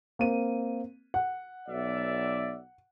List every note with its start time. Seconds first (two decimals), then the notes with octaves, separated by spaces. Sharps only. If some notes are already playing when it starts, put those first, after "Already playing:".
0.19 A#3 C4 D#7
1.14 F#5
1.69 B1 D5 E5